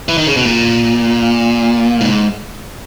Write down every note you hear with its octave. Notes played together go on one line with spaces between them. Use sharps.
E3
D#3
C#3
B2
A#2
G#2